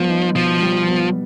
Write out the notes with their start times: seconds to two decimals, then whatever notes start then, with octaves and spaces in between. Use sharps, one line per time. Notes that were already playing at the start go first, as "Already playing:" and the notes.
Already playing: F3 G3 B3
0.09 D#4
0.36 B2 F3
0.62 G3
0.88 B3